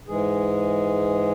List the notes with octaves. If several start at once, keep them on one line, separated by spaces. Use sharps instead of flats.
G#2 E3 G#3 G#4